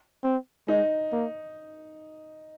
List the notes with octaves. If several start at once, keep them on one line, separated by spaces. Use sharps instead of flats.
C4
G#3 D#4
A#3